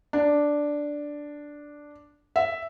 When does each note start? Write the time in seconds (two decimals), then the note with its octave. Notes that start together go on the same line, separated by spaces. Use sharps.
0.13 D4
2.36 E5